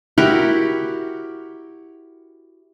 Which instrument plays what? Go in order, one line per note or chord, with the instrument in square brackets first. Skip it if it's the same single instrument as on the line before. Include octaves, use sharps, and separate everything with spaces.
[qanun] E4 F#4 G4 A#4